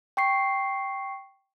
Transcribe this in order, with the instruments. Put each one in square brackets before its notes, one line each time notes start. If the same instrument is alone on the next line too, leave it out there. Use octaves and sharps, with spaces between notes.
[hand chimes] G5 C#6 C7